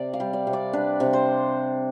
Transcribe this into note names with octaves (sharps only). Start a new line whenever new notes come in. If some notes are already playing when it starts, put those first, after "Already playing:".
Already playing: C3 D5
F5
G3
D5
C3
D5
D4 B4
C3
C5